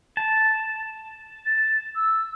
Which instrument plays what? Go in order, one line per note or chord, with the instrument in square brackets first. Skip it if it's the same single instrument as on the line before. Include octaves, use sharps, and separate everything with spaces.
[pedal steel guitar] A5
[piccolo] A6
E6